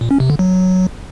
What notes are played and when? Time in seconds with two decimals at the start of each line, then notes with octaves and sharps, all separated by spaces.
0.01 A#2
0.11 C#4
0.20 C3
0.30 D3
0.39 F#3